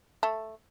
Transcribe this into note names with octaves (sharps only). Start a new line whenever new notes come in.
A3